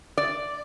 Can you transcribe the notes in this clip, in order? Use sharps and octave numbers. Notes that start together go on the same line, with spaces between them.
D5